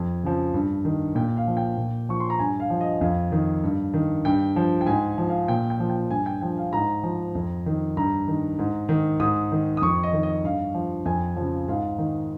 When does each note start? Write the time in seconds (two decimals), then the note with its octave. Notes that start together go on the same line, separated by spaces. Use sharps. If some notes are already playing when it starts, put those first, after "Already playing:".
Already playing: F2
0.23 C#3 F3
0.54 G2
0.85 D#3
1.15 A#2 G5
1.37 F5
1.47 F3
1.57 G5
1.77 A#2
2.09 F3 C#6
2.20 C6
2.30 A#5
2.39 G2 G#5
2.60 F5
2.70 F3
2.81 D#5
3.01 F2 F5
3.32 D#3
3.64 G2
3.94 D#3
4.25 G2 G5
4.56 F3
4.81 G5
4.86 G#2 G#5
5.18 F3
5.29 F5
5.48 A#2 G5
5.70 G5
5.80 F3
5.90 G5
6.10 G2 G#5
6.26 G5
6.41 F3 G5
6.57 F5
6.73 G#2 A#5
7.03 F3
7.35 F2
7.66 D#3
7.97 G2 A#5
8.28 D#3
8.59 G#2
8.89 D#3
9.20 G#2 D#6
9.52 D#3
9.77 D#6
9.82 F2 C#6
10.03 D#5
10.13 D#3
10.23 D#5
10.44 G2 F5
10.74 F3
11.05 F2 G#5
11.36 C#3 F3
11.68 G#2 F5
11.98 D#3